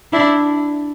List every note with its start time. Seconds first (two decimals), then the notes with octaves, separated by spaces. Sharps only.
0.13 D4 E4